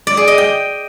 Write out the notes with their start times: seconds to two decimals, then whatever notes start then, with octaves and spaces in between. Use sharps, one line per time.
0.07 D5
0.17 G#4
0.28 D#5
0.38 G5